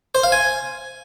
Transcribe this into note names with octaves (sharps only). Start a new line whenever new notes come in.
C5
F5
G#5